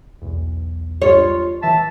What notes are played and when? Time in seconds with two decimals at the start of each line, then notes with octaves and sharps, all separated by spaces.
0.22 B1 E2
1.02 F4 C#5
1.62 E3 E5 A5 B6